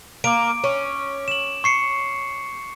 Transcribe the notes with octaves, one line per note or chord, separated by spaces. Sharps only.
A#3 D6 D7
C#4
E7 F#7
C#6 C7 C#7